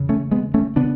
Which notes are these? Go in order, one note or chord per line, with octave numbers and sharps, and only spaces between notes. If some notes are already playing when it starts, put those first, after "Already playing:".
Already playing: E2 C#3
A3 C#4
G#3 B3
A3 C#4
C#3 B3 D4